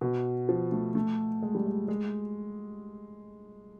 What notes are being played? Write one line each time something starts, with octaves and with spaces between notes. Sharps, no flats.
B2
F3
A3
A3
G#3
G3
G#3
G#3